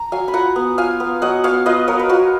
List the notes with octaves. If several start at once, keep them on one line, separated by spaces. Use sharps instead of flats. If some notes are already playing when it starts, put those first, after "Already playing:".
Already playing: A#5
F#3 F5 G#5
B5
F4 F#5 A#5
B3
F4 F5 G#5
B3
F#3 D#5 F#5
B3 C#5 F5
F4 B4 D#5
F#3 A#4 C#5
B4
F4 F#4 A#4